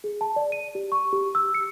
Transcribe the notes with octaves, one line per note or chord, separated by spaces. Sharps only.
G#4
A5
D5
D#7
G4
C#6
G4
E6
C#7